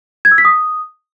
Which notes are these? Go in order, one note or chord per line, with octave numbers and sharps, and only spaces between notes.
G#6
E6
B6
D#6